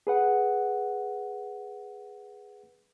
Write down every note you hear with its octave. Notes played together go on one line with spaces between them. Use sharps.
G#4 B4 F#5